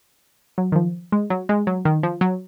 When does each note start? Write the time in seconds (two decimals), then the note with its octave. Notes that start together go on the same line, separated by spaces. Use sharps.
0.58 F#3
0.72 D#3
0.76 F3
1.12 G#3
1.30 F#3
1.49 G#3
1.67 F#3
1.85 D#3
2.03 F3
2.21 F#3